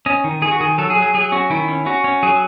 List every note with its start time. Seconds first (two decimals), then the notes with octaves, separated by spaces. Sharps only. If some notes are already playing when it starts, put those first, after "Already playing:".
0.06 C#4 D#5
0.24 D#3
0.42 D#3 G#4
0.51 F#4
0.60 D#3 G#4
0.78 F#3 A4
0.90 G#4
0.96 F#3
1.02 G#4
1.14 F#3 G#4
1.32 C#4 F#4
1.50 D#3 E4
1.68 C#4
1.86 C#4 F#4
2.04 C#4
2.23 F#3 G#4